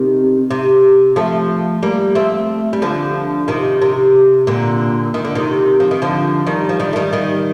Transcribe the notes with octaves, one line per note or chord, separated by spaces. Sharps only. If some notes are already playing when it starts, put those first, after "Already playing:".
Already playing: C3 D#3
C3
F3 A3
G3 A#3
A3 C4
G3
D3 F3
C3 D#3
C3
A#2 D3
D#3
D3
C3 D#3
F3
D#3
D3 F3
D#3 G3
F3
D#3 G3
A3
D#3 G3
D#3 G3